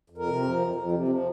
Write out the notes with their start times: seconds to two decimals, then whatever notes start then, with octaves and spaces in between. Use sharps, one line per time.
0.10 F2
0.18 A#4
0.27 C3
0.43 F3
0.59 F2
0.75 F2
0.91 C3
1.08 F3